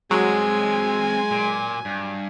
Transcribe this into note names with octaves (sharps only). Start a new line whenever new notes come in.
F#3 G#3 C4 D#5 G#5
A#2
G2